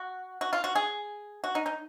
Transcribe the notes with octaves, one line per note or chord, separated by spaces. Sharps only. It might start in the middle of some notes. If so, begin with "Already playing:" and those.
Already playing: F#4
F#4
F4
F#4
G#4
F#4
D#4
D#4